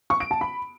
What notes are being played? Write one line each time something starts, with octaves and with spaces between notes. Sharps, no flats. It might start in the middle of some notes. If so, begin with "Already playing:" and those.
C#6
D7
A5
B5